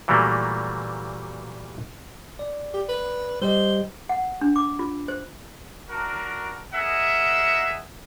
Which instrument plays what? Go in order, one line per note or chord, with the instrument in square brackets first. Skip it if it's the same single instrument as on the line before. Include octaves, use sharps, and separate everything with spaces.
[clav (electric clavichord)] A#2 E3 F#3 G3 A3 A#3
[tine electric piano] D5
[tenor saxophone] G4
B4
[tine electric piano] G3 G4 D#5 [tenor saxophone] C5
[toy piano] F#5
D4
D6
F4
C5
[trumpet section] D4 F#4 A#4
G#4 A#4 D#5 E5 F#5